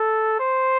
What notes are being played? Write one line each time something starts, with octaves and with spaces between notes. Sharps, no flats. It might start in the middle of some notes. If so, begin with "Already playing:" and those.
Already playing: A4
C5